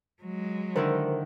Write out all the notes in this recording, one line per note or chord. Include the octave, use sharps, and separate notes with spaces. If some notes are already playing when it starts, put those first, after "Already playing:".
F#3 G#3
D3 D#3 E4 A#4 C5